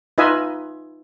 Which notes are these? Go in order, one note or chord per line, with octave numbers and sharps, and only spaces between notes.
D#4 F4 B4 D#5 E5 G#5